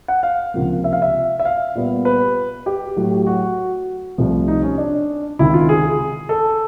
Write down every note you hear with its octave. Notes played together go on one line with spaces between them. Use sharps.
F#5
F5
C#2 C3 F3 A#3
E5
F5
E5
E5
F5
A#2 G3 B3
B4
G4
A2 F#3 A3
F#4
C2 C3 F3 A3
D#4
C#4
D4
C#2 C3 D#3 E4
F4
G#4
A4